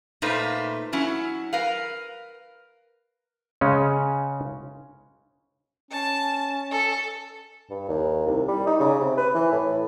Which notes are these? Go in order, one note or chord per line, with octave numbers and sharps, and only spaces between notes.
A#2 A3 A#3 D#4 B4 C5
F#3 C#4 E4
A#4 B4 F5
C#3 G#3 C#4
C#4 A5
A4
G2
D#2
C2
G3
D#4
C#3
C3
B4
E3
A2